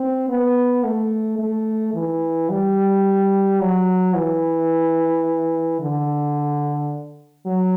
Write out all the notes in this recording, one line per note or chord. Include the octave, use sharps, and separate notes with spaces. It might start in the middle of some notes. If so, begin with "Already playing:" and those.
Already playing: C4
B3
A3
A3
E3
G3
F#3
E3
D3
F#3